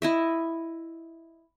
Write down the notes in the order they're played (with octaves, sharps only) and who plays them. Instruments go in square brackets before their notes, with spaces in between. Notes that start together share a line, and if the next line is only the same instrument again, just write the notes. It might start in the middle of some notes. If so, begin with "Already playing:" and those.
[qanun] E4 D#5 E5